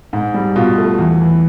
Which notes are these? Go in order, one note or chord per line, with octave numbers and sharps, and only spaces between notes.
G#2
G3
B2 F4
A3
E2
E3